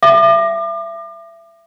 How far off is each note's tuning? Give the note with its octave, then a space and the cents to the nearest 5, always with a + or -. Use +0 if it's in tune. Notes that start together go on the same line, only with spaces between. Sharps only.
E5 +25 D6 +35